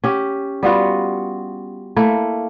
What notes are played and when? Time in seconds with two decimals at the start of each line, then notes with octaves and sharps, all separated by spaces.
0.04 C#4 G4
0.63 G3 B3 F4 F#4
1.96 A3 A#3 E4